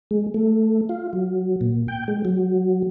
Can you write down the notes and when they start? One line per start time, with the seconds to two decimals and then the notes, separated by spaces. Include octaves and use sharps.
0.11 G#3
0.34 A3
0.89 F4
1.13 F#3
1.61 A#2
1.88 G5
2.08 G#3
2.25 F#3